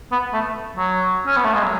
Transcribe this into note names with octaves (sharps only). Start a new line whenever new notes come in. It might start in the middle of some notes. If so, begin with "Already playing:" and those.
B3
A3
F#3
C#4
B3
A3
G#3
F#3